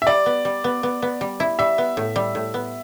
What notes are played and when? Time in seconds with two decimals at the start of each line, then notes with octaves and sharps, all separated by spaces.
0.02 E5
0.07 G3 D5
0.26 B3
0.45 G3
0.64 B3
0.83 B3
1.02 B3
1.21 G3
1.40 E4
1.59 G3 E5
1.78 B3
1.97 A2
2.16 G3
2.35 A2
2.54 B3